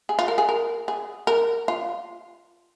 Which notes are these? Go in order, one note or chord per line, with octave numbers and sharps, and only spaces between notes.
G#4
F4
A#4
G#4
A#4
G#4
A#4
F4